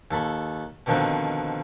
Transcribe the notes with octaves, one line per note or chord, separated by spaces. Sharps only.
D#2 A4 A5 B5 C#6
B2 D3 D#3 F3 B3 C4